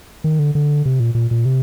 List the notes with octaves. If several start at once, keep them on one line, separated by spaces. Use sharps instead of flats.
D#3
D3
D3
C3
A#2
A#2
A#2
C3